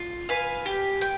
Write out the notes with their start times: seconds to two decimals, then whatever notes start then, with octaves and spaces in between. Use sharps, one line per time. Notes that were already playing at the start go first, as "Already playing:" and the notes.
Already playing: F4
0.29 B4 F5 G#5
0.66 G4
1.01 G5